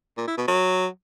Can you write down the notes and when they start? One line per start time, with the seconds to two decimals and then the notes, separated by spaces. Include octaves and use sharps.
0.17 A#2
0.27 E4
0.38 B2
0.48 F#3